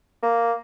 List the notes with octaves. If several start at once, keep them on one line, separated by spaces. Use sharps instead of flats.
A#3